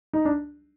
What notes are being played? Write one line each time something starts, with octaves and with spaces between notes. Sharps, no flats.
D#4
D4